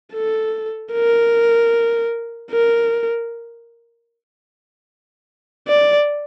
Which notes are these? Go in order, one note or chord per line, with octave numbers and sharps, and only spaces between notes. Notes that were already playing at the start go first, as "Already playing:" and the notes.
A4
A#4
A#4
D5